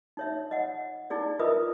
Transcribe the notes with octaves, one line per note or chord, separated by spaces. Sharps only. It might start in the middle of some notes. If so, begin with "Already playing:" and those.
D#4 C#5 E5
D#5 F#5
D#4 E4 G#4 D5
F4 A#4 B4 D#5 E5 D#6